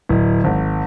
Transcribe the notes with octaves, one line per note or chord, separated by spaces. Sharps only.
D1
G#1